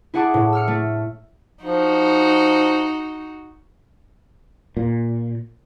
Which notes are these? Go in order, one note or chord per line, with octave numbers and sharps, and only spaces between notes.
E4 G#4 F#5 A5 D6
A2
E6 F6 C#7
A3
F3 D#4 F#4
A#2